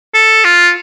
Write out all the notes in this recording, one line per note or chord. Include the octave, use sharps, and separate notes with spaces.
A4
F4